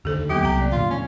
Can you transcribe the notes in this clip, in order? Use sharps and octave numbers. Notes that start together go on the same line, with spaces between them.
D#2 D3 D#3 G4 A4 C5
F#3 A#3 B3 G4
C2 C3 A3 A#5
A#3 D5
A#2 D3 F4
D#1 C3 A3 C#4